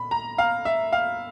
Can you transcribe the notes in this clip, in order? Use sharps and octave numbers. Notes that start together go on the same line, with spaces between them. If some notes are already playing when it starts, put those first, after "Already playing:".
Already playing: A#2 B5
A#5
F5
E5
F5